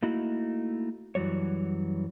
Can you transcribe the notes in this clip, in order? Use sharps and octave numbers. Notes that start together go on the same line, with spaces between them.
A3 A#3 D#4 E4 F#4
F#2 E3 F#3 G3 C#5